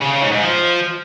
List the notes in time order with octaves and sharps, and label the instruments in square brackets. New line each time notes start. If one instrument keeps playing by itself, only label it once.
[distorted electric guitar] C#3
C#3
G#2
G#2
F3